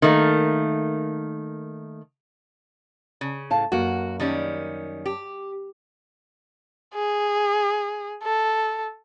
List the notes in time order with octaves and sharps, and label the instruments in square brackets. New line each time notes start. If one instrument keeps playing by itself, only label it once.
[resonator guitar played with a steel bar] D#3 A3 A#3
C#3
[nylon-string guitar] A2 F5 A5
[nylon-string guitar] F#2 A#3 [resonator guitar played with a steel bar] F#4
[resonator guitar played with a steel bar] D#3 G3 C#4
G4
[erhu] G#4
A4